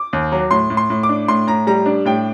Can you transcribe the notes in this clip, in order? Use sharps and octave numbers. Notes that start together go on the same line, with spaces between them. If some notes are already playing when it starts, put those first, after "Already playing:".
Already playing: D6
D#2
F#3
A2 C6
A2
C6
A2
D6
D4
A2 C6
A2 A#5
G3 A#5
D4
A2 G5